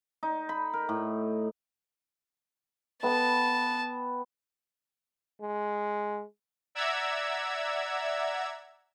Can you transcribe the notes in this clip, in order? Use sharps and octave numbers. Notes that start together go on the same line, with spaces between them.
D#4
B5
A#4
A2
B3 G5 A5
G#3
D5 E5 F#5 A#5 E6 G#6